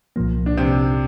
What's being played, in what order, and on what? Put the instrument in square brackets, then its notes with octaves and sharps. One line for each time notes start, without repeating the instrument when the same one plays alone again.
[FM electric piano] C2 A#2 F3 A#3
[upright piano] D4
C3 C4